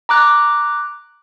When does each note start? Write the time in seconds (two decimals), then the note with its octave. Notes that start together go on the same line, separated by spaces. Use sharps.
0.09 A#5 D6 F#6